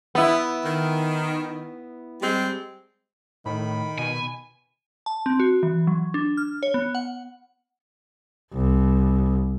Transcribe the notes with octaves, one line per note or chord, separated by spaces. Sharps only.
B3 E4
D#3
G3 G#3 C4
A2 D#3 B5
B2 G#5
A5
C4
F#4
E3
F#3
D4
F6
C#5
B3
F#5
C2